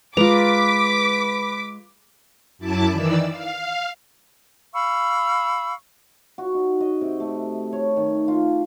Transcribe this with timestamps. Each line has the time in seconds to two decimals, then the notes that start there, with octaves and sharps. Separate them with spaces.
0.17 G#3 F4 B4 A#5 D6 B6
2.58 F#2 E4 A5 D6
2.91 D#3 E3 D5 E6
3.29 F5
4.74 F5 B5 C#6 E6
6.38 F#4
6.55 D#4
6.80 D#5
7.01 C3
7.20 A3
7.73 C#5
7.96 D#3
8.28 F4